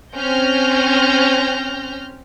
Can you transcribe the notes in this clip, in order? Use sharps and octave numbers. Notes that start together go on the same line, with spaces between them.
C4 C#4 F6 G6 A#6